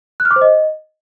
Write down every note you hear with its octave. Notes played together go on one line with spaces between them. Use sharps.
F#6
F6
D6
C5
D#5